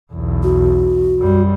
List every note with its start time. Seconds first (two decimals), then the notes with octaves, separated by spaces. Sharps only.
0.13 B1 E2
0.43 F#4
1.19 F#2 G3